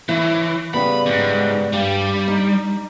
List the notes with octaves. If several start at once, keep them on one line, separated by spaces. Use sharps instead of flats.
E3 E4 C#5
C#3 G3 B3 B5
E2 G#2
G2 G3
D#4